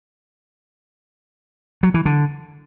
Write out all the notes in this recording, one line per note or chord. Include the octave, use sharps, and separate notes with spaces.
F#3
E3
D3